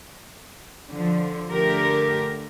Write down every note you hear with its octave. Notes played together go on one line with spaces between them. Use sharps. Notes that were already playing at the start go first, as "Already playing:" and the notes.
D3 F3
D3 A3 G4 A#4